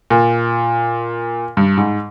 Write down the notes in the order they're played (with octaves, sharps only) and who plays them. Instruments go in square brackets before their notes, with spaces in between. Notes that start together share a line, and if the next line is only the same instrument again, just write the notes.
[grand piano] A#2
G2
G#2